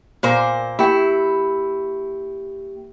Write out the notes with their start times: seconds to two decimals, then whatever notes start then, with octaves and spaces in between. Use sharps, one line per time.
0.23 A#2 A#4 C5
0.79 A#3 E4 G4 G5